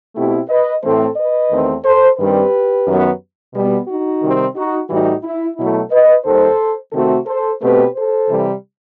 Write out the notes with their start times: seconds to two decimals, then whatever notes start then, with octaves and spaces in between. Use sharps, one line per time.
0.15 B2 A3 C4 E4 G4
0.49 B4 D#5
0.83 A2 E3 A3 C4 A4 C5
1.16 B4 D#5
1.51 E2 D#3 A3 C4
1.85 A4 C5
2.18 G2 D#3 G3 C4 G4 B4
2.86 F#2 D#3 F#3 B3
3.54 B2 G3 B3
3.88 D#4 F#4
4.22 C3 D#3 G3 C4
4.56 D#4 F#4
4.89 A2 E3 G3 D#4 F#4
5.23 E4
5.57 B2 F#3 A3 E4
5.91 B4 D#5
6.24 D#2 D#3 G3 A4 C5
6.92 C3 D#3 A3 C4 F#4 A4
7.26 A4 C5
7.60 B2 A3 C4 G4 B4
7.94 A4 C5
8.28 C3 E3 G3